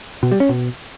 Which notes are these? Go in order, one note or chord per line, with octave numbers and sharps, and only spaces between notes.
B2
G3
C#4
B2